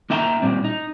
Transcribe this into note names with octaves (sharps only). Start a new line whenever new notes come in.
A#3 D#4 E5 G5 A5 A#5
A#2 G3 C4
D#4